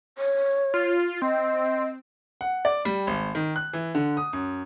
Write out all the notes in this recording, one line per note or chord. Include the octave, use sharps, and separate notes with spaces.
C#5
F4
C4 D#5
F#5
D5
G3
G#1
D#3
F#6
E3
D3
D#6
F#2